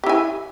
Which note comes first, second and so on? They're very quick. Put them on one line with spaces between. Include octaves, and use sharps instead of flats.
G4 E4 G#5